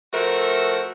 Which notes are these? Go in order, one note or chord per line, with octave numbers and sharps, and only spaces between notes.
F3 A3 F#4 A#4 E5